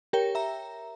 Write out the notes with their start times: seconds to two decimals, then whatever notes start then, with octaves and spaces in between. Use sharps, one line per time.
0.13 G4 A#4 C#5 G5
0.35 E5 A#5